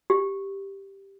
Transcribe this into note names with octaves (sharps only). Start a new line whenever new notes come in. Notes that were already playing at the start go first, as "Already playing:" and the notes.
G4